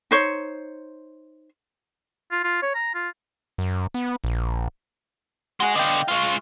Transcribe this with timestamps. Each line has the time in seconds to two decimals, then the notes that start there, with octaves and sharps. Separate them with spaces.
0.11 D#4 C5 C#5
2.31 F4
2.44 F4
2.62 C#5
2.74 A#5
2.94 F4
3.58 F#2
3.94 B3
4.24 A#1
5.60 G#3 F#4 G#4 F#5
5.75 D3 B3 D#5 F5 G5
6.08 G#3 F4 C#5 F5